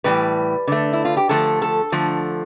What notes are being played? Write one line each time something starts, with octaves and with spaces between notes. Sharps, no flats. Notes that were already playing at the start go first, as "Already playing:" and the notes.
A2 E3 G3 B4
D3 A3
E4
F4
G4
D3 F3 A3 A4
A4
D3 F3 A3